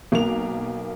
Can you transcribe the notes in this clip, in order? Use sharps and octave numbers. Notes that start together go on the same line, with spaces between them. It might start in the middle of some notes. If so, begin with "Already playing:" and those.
B1 A#3 F7